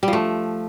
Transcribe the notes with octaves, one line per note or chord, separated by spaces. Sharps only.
G3
F3
A3